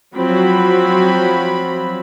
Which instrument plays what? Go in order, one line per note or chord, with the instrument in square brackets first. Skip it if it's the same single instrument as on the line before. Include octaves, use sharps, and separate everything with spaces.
[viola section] F3 F#3 C4 B5